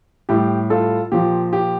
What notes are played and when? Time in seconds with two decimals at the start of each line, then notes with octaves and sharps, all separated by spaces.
0.29 A2 G3 G4
0.70 F4 A4
1.12 A#2 F3 G4
1.53 G4